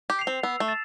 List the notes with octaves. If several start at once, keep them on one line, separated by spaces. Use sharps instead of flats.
G4
C7 F7
C4
B3 E6
A3
A6 E7